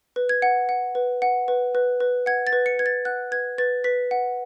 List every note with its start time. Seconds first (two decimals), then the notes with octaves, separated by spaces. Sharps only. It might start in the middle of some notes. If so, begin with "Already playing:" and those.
0.16 B4
0.29 G#6
0.42 F#5
0.69 F#5
0.95 B4
1.22 F#5
1.48 B4
1.75 B4
2.00 B4
2.26 F#5 G#6
2.47 A6
2.53 B4
2.66 C#7
2.79 B4 G#6
2.86 A6
3.05 F#5 F#6
3.32 B4 G#6
3.58 B4 A6
3.84 B4 B6
4.11 F#5